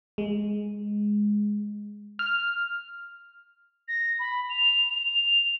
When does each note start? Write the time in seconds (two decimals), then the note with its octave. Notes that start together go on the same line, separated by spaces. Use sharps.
0.18 G#3
2.19 F6
3.88 A#6
4.19 B5
4.50 F7
5.10 F7